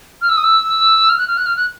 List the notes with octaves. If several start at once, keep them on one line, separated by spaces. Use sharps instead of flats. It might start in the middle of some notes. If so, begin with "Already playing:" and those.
F6
E6
D#6
E6
F6
F#6
F6
F#6
F6
F#6